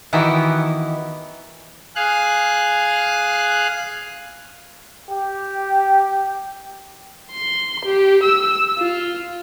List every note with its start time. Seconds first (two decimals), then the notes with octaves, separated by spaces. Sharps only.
0.13 D#3 E3 B3 E4 F#4 G4
1.96 G#4 F5 F#6
5.11 G4
7.33 C6
7.85 G4
8.23 E6
8.79 F4